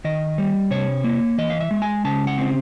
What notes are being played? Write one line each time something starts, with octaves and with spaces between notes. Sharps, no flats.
D#3 D#5
G3
C3 C#5
A#3
E3 D#5
F5
E5
G#3
G#5
C#3 A5
F#5
C4